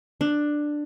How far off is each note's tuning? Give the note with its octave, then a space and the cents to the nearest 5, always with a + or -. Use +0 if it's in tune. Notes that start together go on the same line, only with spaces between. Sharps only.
D4 +10